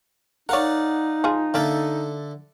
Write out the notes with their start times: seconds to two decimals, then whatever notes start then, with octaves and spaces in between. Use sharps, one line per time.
0.49 D#4 A#4 C#5 D5 F5 F#5
1.24 F3 F4 G#4
1.54 D3 A#3 A4 E5 F5